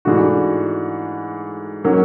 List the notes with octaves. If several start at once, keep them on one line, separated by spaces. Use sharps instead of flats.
G#2 E3 A3 D4 F#4
D#3 F#3 A#3 C#4